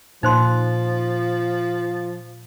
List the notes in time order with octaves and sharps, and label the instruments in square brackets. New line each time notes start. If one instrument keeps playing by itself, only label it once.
[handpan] A#2 [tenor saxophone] F3 [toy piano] D#4 C5 C6